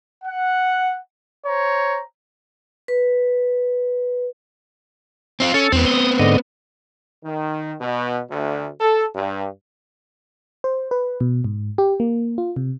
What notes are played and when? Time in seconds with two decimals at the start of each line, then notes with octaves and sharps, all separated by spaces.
0.24 F#5
1.46 C5 C#5 A#5
2.88 B4
5.40 C4 E4 F4
5.54 C#4 A4
5.72 E2 B3 C4
5.86 D#6
6.19 G#2 D3 D#5
7.25 D#3
7.80 B2
8.31 D2
8.80 A4
9.16 G2
10.64 C5
10.91 B4
11.20 B2
11.44 G#2
11.78 G4
12.00 A#3
12.38 F4
12.56 C3